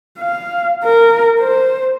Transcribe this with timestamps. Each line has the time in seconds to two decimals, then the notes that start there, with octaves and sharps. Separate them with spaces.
0.19 F5
0.84 A#4
1.40 C5